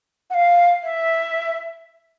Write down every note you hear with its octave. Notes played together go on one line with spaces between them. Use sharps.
F#5
F5
E5